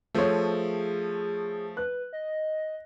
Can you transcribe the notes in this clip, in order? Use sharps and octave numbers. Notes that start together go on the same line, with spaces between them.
F3 A3 G#4 A4 C5 C#5
B4 F#6
D#5